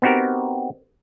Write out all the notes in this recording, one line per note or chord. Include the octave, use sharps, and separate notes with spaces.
B3 C4 D#4 F#4 G4 A#4